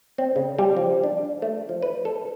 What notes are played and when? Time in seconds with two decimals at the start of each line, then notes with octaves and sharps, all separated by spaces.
0.18 C4
0.36 C#3
0.59 G3
0.77 F3
1.04 D4
1.42 A3
1.69 F3
1.83 B4
2.05 A4